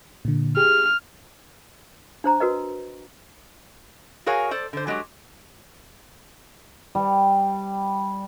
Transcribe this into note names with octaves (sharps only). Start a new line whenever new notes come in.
A#2 D3
G4 G#4 F6
D4 C5 A#5
F#4 A#4 B4 D#5
F#4 G#4 A#4 C#5 F5 G#5
A4 C5 D5
D3 C5
F#3 G#3 F#4 G4
G3